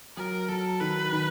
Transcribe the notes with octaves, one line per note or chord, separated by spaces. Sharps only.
F#3 A#4
F#3 A4
D#3 B4
D#3